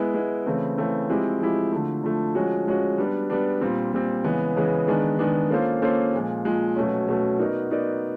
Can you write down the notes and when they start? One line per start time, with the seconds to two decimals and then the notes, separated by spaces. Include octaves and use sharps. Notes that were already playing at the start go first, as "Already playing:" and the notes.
Already playing: G#3 B3 E4
0.14 G#3 B3 E4
0.46 C#3 E3 A3 C4
0.78 C#3 E3 A3 C4
1.09 F3 G#3 C4 E4 G4
1.40 F3 G#3 C4 E4 G4
1.72 D3 F3 A3
2.03 D3 F3 A3
2.35 F3 G#3 C#4 F#4
2.66 F3 G#3 C#4 F#4
2.98 G3 B3 D4
3.30 G3 B3 D4
3.61 A#2 G3 C4
3.93 A#2 G3 C4
4.24 C#3 E3 G#3 B3
4.56 C#3 E3 G#3 B3
4.87 D#3 G#3 B3 D4
5.19 D#3 G#3 B3 D4
5.50 A#3 C#4 F4 A4 C5
5.82 A#3 C#4 F4 A4 C5
6.13 A#2 F3 G#3
6.45 A#2 F3 G#3
6.76 B2 F#3 A3 C#4
7.08 B2 F#3 A3 C#4
7.39 B3 D#4 F#4 A#4 D5
7.71 B3 D#4 F#4 A#4 D5